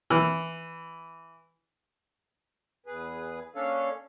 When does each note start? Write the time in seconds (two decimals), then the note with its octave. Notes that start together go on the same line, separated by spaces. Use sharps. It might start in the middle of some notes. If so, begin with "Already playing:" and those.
0.10 E3
2.86 E2 G#4 B4
3.55 A#3 C#4 D4 A4 C#5 F5